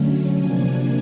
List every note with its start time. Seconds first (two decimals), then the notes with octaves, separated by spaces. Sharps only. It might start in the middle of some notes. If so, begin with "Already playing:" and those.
Already playing: D3 F#3 A3 C#4
0.37 C3 F3 A#3 D4 G#5